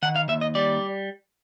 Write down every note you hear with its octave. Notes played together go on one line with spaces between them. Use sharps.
D#3 F#5
F5
D#2 E5
D#5
G3 D5